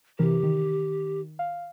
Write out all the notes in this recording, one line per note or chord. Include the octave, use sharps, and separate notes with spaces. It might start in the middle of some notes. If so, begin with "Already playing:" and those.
C3 E3 G4 A#4
D#3
F5